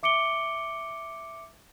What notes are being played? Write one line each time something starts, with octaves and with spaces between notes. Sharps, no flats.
E5 D6 C#7 D7 G7